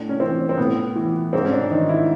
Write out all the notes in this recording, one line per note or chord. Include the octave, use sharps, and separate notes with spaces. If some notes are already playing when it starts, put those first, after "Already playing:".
Already playing: A2 D4
C#4
E3 C4
C4
A2 B3
E3
G#2 C4
C#4
D4
D#3 D#4
E4